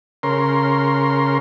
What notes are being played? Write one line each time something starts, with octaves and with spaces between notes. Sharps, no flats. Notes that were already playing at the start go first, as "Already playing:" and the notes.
C#3 A#4 C6